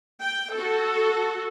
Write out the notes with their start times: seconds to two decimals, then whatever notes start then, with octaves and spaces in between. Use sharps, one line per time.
0.21 G5
0.53 F#4 A4